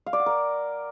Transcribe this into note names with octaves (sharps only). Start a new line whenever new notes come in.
F5
D5
F#5
A#4